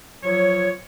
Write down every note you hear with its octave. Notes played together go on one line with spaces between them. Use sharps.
F3 F#3 C#5